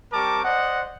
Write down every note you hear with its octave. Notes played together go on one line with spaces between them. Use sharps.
G3 C4 A#4 A5 C#6 D6
C5 D5 D#5 F#5